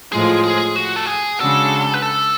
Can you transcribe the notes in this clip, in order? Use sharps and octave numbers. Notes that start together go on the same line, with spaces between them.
A2 F3 G#3 G#4
G#4
F#4
A4
G#4
C#3 G#3 D4 F#4 A4
B4
A4